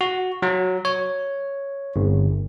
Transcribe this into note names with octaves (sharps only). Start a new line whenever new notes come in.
F#4
F#3
C#5
G1